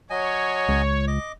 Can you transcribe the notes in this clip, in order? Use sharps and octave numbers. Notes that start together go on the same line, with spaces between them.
F#3 C#5 D#5 G#5
C#2
D#5 D6